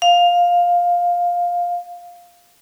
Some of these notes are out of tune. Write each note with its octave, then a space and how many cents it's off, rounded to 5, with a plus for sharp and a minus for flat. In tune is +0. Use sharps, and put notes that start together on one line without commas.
F5 +10